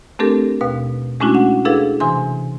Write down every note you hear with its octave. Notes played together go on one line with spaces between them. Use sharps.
A3 C4 D4 G4 A4 A#4
D#2 B2 B4 F5
G#3 A3 C#4 D4 E4 F#4
D4 F#5
D4 E4 G#4 A4 B4 F5
C3 E3 G#5 C6